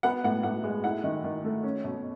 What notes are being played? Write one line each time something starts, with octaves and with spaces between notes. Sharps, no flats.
B3 F#5
A2 F#5
A2 F#5
G#3
E4 F#5
D#3
D#3
A3
C#4
B2